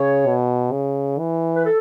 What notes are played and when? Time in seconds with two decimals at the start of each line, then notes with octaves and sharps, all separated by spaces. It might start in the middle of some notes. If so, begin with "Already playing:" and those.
Already playing: C#3 C#5
0.27 B2
0.72 C#3
1.19 E3
1.56 B4
1.65 A4